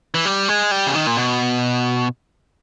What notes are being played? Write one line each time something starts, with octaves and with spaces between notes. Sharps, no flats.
E3
G3
G#3
G3
C#3
D#3
A#2
B2